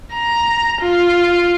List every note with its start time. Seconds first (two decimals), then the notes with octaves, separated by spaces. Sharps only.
0.14 A#5
0.81 F4